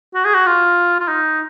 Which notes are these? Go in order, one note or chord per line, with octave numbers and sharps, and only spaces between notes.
F#4
G#4
F#4
F4
F4
D#4